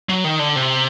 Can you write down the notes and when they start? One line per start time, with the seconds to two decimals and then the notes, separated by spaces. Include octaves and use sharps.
0.09 F#3
0.24 D#3
0.39 D3
0.55 C3